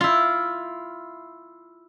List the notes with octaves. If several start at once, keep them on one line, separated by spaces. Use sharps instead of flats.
E4 F4